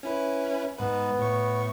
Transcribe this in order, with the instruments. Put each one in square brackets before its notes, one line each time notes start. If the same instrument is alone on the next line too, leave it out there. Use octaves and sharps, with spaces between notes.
[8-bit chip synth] C#4 E4 B4
[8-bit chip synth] G#2 B4 [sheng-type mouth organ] B3
[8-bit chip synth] A2 C#6